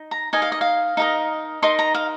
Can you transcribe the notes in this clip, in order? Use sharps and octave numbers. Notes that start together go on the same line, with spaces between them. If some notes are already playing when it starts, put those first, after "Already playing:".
Already playing: D#4
A#5
D#4 A#4 D#5 G#5
F5
D#5
F5
D#4 A#4 D#5
D#4 A#4 D#5 C6
A#5
F5